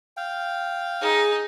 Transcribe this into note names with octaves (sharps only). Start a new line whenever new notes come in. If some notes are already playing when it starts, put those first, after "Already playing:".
F5 G5
D#4 G#4